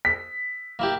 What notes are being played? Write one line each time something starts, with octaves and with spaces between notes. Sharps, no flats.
B6
A#3 E4 G4